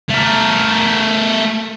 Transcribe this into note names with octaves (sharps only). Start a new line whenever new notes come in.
A3 A#4